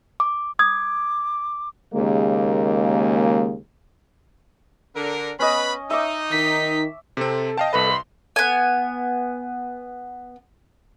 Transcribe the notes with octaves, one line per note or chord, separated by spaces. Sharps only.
D6
D6 D#6 G#6
D#2 C#3 G#3 A#3
D3 A#4
B3 C#4 B4 D#5 B5
D#4 E5 D6
D#3 B6
C3 C4 A4
D#5 F5 G5 A5
C2 A4 B4 D#5 B5
C6
B3 G#5